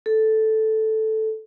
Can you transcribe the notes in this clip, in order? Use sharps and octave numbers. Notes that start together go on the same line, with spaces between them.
A4